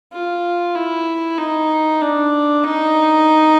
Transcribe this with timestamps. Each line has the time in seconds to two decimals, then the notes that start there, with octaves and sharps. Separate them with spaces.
0.13 F4
0.76 E4
1.38 D#4
2.01 D4
2.64 D#4